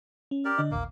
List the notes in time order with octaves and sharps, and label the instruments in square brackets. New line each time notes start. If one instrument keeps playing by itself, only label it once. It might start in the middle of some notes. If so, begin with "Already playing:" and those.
[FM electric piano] C#4
[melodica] G4 A#4 D5
[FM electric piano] D3 D4 D#5
[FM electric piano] A1 D#2 A#2 [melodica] A#3